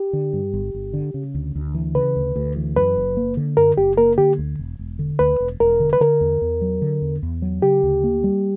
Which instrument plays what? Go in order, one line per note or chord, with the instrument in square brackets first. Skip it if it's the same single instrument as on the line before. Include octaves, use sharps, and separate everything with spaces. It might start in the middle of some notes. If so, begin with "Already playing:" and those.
Already playing: [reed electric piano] G4
[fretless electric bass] D3
G2
G1
G1
D3
C#3
D2
D2
E3
[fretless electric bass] C#3 [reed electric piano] B4
[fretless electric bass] D2
D2
E3
[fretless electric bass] F#2 [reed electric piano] B4
[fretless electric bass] F#1
A#3
D3
[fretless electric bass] F#2 [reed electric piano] A#4
[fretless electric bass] F#1 [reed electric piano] G4
[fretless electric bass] A#3 [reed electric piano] A#4
[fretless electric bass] D3 [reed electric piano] G4
[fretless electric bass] D2
E1
E1
D3
[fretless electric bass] D2 [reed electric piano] B4
[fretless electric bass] E1
[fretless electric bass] E1 [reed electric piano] A#4
[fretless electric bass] D3
[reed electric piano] B4
[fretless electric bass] D3 [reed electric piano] A#4
[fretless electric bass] E2
E2
F#3
D3
E2
E2
F#3
[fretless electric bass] C#3 [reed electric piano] G4
[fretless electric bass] D2
A#3
G3